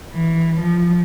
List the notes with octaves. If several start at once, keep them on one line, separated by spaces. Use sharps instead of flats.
E3
F3